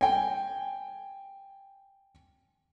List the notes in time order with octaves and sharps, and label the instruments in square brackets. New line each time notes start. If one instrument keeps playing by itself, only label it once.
[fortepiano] G5 G#5